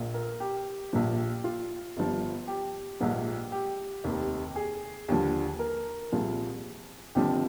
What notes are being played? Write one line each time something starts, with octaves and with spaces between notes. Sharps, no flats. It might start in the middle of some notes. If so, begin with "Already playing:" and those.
Already playing: A#1 A#2
A#4
G4
A#1 A#2 F3
F4
G1 G2 F3
G4
A#1 G#2 F3
G4
F1 D#2 D#3
G#4
D#2 D3 F3
A#4
C2 A#2 F3 G#4
F1 F2 D3 F3 G4